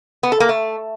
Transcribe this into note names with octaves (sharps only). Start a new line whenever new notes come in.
B3
A4
A#3
A3